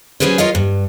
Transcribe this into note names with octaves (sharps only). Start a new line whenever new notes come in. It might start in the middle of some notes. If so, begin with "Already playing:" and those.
F#3 C#4 G#4 B4 C5
F4 A#4 C#5 D#5 F5
G2